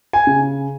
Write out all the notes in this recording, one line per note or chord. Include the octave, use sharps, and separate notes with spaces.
G#5
C#3